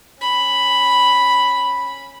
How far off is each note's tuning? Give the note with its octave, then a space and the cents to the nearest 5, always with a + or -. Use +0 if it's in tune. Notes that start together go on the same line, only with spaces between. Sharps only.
C#4 -15 B5 +0